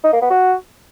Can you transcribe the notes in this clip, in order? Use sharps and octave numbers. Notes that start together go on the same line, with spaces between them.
D#4
A#3
B3
F#4